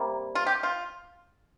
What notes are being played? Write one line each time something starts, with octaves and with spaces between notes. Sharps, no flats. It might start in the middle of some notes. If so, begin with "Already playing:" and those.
Already playing: C3 G3 A#3
F4
G4
F4